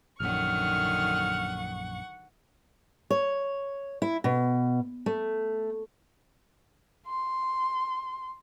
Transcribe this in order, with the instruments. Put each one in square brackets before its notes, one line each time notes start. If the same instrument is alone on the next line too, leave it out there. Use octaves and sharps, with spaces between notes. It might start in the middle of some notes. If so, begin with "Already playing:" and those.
[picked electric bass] A#1 F#2 [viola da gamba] D3 D#3 F#3 [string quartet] F#5 C#6 [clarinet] F6
[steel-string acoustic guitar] C#5
E4
B2
A3
[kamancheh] C6